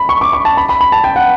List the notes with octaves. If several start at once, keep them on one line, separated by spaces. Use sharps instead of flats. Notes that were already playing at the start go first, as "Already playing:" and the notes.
Already playing: B5
C#6
D6
C#6
A5
B5
B5
B5
A5
G5
F#5